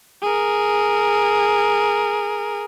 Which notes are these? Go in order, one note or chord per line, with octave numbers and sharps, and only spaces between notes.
G#4 A#4